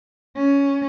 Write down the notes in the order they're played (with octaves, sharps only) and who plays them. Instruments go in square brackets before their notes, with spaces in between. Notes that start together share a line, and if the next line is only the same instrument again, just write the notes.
[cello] C#4